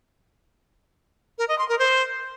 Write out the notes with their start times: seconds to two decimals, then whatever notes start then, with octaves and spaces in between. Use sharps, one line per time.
1.38 A#4
1.48 D#5
1.59 C6
1.69 A#4
1.79 C5